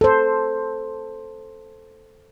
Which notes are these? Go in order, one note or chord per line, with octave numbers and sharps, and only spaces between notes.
A4 C5